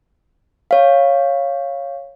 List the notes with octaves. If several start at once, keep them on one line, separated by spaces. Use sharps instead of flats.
C#5 F5